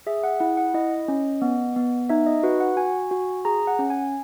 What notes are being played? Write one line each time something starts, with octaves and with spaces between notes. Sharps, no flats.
G#4 E5
F#5
E4 F#5
F#5
E4 D#5
C#4
B3
B3
D#4 E5
D#5
F#4 B4
F#5
F#4 G#5
F#4
G#4 A#5
F#5
C#4
G#5